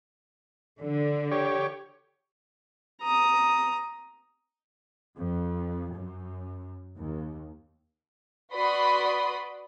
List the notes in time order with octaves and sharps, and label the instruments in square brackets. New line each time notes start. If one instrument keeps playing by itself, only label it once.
[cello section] D3
[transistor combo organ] G4 C#5
[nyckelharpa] A#5 D#6
[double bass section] F2
F#2
D#2
[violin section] F#4 B4 D5 B5 C6 D#6